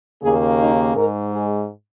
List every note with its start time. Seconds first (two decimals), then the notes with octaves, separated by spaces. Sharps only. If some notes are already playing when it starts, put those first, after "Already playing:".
0.23 D#2 C#3 A#3 G#4
0.59 D#4
0.95 G#2 G#3 A#4
1.32 G#4